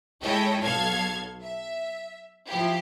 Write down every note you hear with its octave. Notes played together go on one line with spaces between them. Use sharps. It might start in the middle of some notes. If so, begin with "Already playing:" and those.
G#3 E4 A4 C#5 D#5 G5
B1 B2 A4 F5 F6 G#6
E5
F3 E4 G4